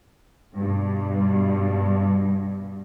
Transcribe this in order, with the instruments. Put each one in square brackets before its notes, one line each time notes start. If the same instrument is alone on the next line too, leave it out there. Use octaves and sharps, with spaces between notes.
[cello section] G2 B2